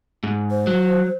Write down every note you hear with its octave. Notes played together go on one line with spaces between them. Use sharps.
G#2
C5
F#3